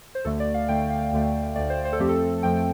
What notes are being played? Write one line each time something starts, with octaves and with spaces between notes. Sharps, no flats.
C5
D2 D3 A3 A4
D5
F5
D2 D3 A3 G5
F5
D2 D3 A3
D2 D3 A3 D5
C5
C5
A4
F2 F3 A3 C4 G4
A4
F2 F3 A3 C4 G5